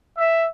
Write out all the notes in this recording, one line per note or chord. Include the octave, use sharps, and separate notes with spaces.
E5